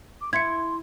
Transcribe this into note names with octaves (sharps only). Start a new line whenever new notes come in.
D6
E4 C6 G#6 C#7